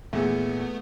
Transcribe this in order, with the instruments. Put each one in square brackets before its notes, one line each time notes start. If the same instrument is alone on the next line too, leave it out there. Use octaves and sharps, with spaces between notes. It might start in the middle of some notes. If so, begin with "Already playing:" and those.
[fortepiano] E2 [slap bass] A#2 [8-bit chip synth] A3 B3